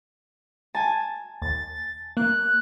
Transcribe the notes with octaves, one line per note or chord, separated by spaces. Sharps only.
G#5 A5
D#2 A6
A#3 F#6